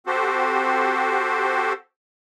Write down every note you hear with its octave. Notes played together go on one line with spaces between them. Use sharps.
C4 F#4 G4 A4 C5